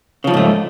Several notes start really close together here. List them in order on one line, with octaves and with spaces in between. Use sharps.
C#3 F3 F2 G#2 A3